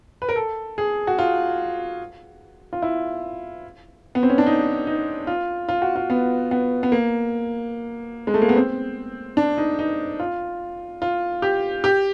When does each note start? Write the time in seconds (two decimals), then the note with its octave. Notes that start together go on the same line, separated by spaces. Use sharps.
0.22 B4
0.29 A#4
0.36 A4
0.78 G#4
1.07 F#4
1.18 F4
2.73 F4
2.82 E4
4.15 B3
4.23 C4
4.30 C#4
4.38 D4
4.46 D#4
4.87 D#4
5.27 F4
5.69 F4
5.82 F#4
5.96 F4
6.10 B3
6.51 B3
6.83 B3
6.92 A#3
8.27 G#3
8.34 A3
8.42 A#3
8.49 B3
8.56 C4
9.37 D4
9.57 D#4
9.79 D#4
10.20 F4
11.02 F4
11.42 G4
11.84 G4